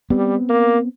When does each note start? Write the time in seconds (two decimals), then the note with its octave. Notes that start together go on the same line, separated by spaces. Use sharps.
0.10 G3 B3 C4
0.49 A#3